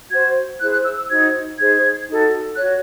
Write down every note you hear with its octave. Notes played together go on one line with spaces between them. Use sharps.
F#4 C5 G#6
E4 G#4 C5 F#6
F#6
E6
E6
D#4 F#4 C5 G#6
D#4 G#4 C5 G#6
D#4 F#4 A4
F#4 C#5 F#6